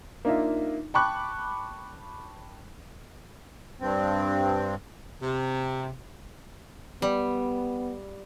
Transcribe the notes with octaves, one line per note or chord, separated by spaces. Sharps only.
A#3 D4 D#4 F4 E5
G5 A5 B5 C#6 D6 F#6
G2 C4
C3
G3 B3